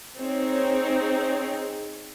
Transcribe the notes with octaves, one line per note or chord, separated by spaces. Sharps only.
C4 D#4 G#4 C#5